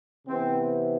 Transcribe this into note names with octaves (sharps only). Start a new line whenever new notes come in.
C3 E3 B3 C4